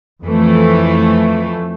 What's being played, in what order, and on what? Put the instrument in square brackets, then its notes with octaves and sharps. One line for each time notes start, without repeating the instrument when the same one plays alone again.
[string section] F2 E3 F3 A3